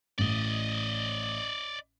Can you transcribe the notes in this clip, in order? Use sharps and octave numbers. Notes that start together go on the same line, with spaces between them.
A1 A2 D5 D#5